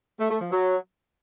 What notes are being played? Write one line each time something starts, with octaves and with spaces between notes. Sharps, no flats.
A3
A3
F3
F#3